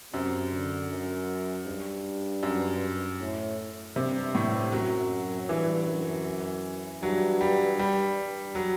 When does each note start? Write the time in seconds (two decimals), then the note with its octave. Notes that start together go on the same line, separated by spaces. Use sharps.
0.13 F#2 C3
0.51 D3
0.90 F#2
1.66 G2
2.43 F#2
3.20 A2
3.96 G2 C3
4.35 A2
4.72 F#2 F#3
5.49 G2 E3
5.87 F#2
7.02 G2 F#3
7.41 G3
7.79 G2 G3
8.55 F#3